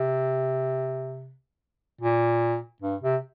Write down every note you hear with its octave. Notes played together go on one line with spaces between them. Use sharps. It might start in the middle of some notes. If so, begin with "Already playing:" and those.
Already playing: C3
A#2
G2
C3